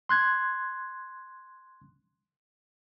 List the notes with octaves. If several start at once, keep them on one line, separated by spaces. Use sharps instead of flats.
C6 F#6 G#6